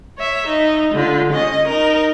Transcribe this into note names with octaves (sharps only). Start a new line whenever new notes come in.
C#5 E5
D#4
D3 F4
C#4 D#5
D#4 A#4